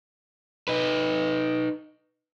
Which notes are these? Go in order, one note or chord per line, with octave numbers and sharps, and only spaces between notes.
D#4 B4